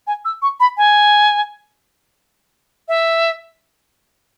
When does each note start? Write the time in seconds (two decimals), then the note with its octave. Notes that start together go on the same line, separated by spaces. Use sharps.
0.07 G#5
0.25 E6
0.42 C#6
0.60 B5
0.77 G#5
2.88 E5